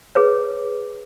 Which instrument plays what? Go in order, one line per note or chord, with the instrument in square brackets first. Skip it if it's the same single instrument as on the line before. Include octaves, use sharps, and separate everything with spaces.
[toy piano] G#4 B4 C#5